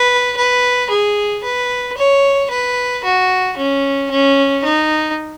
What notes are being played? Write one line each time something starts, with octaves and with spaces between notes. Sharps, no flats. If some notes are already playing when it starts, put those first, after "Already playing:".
Already playing: B4
B4
G#4
B4
C#5
B4
F#4
C#4
C#4
D#4